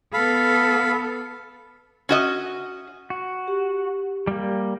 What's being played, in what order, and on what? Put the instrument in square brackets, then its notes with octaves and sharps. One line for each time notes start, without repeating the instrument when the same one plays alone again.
[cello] B3 A4 [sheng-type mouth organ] F5 B5
[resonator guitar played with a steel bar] C#4 F#4 D#5
[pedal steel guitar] F#4
[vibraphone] G4
[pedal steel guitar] G3 A#3